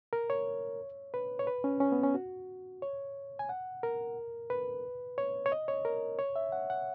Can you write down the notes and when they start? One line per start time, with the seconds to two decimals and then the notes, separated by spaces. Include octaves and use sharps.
0.13 A#4
0.30 C#5
1.14 B4
1.39 C#5
1.47 B4
1.64 C#4
1.80 C#4
1.92 B3
2.03 C#4
2.14 F#4
2.82 C#5
3.39 G#5
3.49 F#5
3.83 A#4
4.50 B4
5.18 C#5
5.46 C#5
5.52 D#5
5.68 C#5
5.85 A#4
6.19 C#5
6.36 E5
6.52 F#5
6.70 F#5